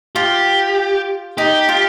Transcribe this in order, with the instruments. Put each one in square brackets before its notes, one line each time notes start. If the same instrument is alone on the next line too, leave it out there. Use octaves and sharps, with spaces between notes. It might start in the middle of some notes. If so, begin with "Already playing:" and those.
[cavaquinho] F4 [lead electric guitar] G4
[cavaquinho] D#4 [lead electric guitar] G4
[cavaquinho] F4